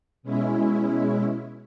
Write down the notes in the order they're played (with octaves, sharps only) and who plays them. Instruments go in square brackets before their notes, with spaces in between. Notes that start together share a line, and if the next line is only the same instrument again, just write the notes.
[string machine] B2 G#3 C#4 E4